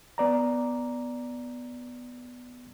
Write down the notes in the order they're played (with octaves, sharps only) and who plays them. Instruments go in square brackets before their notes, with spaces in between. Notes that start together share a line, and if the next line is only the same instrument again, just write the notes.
[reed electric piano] B3 D5 A#5